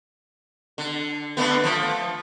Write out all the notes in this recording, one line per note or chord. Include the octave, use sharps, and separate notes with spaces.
D3
D3 A3 B3
F3 A3